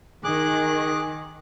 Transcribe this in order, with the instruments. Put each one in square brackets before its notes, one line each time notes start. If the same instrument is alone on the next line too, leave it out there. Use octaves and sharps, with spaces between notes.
[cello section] D#3 [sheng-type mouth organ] G#4 D6 F#6